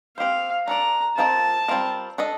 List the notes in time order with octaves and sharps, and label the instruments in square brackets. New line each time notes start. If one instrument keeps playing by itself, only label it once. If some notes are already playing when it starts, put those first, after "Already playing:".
[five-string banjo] C4 G4 C5 [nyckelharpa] F5
[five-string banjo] D4 A4 D5 [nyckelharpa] A#5
[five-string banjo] F3 C4 F4 A#4 D#5 [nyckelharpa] A5
[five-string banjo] G3 C4 F4 A#4
D4 A4 D#5